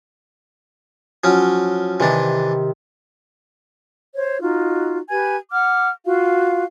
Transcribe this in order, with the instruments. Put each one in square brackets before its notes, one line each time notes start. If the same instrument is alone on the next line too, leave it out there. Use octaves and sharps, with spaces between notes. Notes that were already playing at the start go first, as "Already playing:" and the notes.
[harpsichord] F3 F#3 C#4
[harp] C3 D#3 [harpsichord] E3 D4
[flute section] C5 C#5
D#4 F4 F#4
G4 B4 G#5 G#6
F#5 D6 F6
F4 F#4 F5